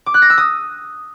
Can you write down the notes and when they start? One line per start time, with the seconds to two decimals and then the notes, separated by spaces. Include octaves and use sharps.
0.06 D6
0.14 F#6
0.22 A#6
0.30 E6
0.38 D#6